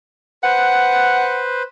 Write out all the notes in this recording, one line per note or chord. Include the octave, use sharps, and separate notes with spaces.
B4 C5 F#5